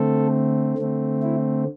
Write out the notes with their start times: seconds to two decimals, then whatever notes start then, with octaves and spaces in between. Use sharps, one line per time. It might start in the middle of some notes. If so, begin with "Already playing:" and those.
Already playing: D3 A3 C4 A4
0.78 D3 A3 C4
1.22 E4